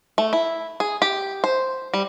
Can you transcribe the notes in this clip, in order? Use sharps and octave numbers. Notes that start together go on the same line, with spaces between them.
A3
E4
G#4
G4
C5
G3